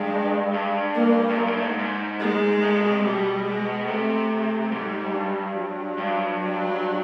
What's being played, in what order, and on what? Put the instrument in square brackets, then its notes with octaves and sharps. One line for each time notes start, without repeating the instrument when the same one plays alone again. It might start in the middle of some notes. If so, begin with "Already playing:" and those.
Already playing: [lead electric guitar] G2 [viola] G#3
[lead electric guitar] G2
[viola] A#3
[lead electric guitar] G2
F#2
G2
A2
G#2
G#2
[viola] G#3
[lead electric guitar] A2
B2
C3
[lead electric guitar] B2 [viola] G3
[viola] G#3
[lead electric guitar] C3 [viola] A3
[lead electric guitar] G#2 [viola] G3
[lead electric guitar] G2
[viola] F#3
[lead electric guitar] G2
[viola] F#3